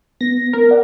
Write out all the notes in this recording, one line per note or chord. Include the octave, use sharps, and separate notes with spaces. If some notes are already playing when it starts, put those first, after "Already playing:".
B3 A#6
A#4
D5 F#5